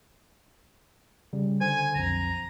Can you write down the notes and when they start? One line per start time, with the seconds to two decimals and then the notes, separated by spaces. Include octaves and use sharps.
1.33 C#3 G3
1.61 D3 C5 G#5
1.95 B1 F2 A#5